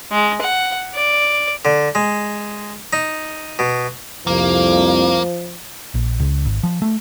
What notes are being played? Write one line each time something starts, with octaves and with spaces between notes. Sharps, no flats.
G#3
F#5
D5
D3
G#3
D#4
B2
C2 F2 F3 A#3
A#1
C#2
G#1
F3
A3